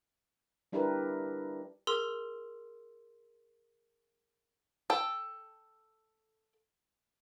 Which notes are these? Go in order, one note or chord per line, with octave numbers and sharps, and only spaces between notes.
G3 D4 E4 G4 A#4 B4
G#4 A#4 C6 E6
A4 G5